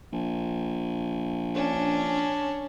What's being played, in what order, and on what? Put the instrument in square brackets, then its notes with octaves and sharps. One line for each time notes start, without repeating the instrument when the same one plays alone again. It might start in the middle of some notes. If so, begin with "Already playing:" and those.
[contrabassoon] A#1
[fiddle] C#4 D4